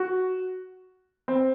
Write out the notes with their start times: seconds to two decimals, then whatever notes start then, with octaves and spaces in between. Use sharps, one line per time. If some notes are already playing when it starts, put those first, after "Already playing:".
Already playing: F#4
1.28 C4